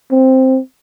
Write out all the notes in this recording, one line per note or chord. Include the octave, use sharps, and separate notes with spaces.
C4